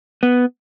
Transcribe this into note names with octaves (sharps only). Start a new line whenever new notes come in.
B3